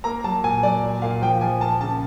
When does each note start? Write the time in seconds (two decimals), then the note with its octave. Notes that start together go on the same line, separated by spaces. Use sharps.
0.04 A#3 A#5
0.24 F#3 A5
0.44 A#2 G#5
0.63 F#3 D5
0.83 A#2
1.02 A#2 F5
1.22 F3 G5
1.41 F3 G#5
1.61 A#3 A5
1.81 C#3 A5